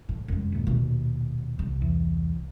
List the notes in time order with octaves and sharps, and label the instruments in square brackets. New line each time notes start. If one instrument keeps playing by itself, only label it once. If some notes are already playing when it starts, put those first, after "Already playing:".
[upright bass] A2
[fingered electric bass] F1 [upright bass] F#2 G#3
[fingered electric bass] D#2 A#2
[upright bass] B2
C2
[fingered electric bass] E2